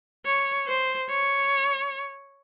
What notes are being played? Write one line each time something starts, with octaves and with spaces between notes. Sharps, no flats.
C#5
C5
C#5